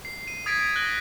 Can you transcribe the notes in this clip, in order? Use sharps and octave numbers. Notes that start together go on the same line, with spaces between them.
C7
D#7
D#6 G#6 A6 B6 D7
F#6 A#6 F#7 G7